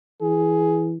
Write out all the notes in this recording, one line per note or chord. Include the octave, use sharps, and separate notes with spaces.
E3 G#4